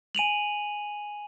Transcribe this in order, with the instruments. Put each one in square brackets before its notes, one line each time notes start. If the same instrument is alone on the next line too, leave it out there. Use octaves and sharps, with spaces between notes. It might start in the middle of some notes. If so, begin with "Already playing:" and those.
[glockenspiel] G#5 D#7 F7 F#7